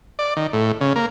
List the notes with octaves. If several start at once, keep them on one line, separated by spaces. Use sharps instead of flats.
D5
D#3
A2
C#3
A#3